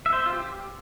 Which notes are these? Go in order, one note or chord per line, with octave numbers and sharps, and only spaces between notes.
E5
C5
E5
F4
G4